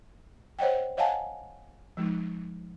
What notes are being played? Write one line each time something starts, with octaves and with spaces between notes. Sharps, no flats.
C5 C#5 D#5 F#5 G5
C#5 D#5 F5 F#5 G#5 A5
F3 G#3 D#4